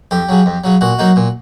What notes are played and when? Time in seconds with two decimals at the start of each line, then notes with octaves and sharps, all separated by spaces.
0.11 F2 G4
0.29 C#3 F#3
0.46 F2
0.64 C#3 F#3
0.81 A#2 F#4
0.99 F#3 A#3 D#4
1.16 A#2